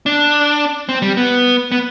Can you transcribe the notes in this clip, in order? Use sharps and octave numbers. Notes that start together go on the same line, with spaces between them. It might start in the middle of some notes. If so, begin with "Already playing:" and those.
D4
C4
G3
B3
B3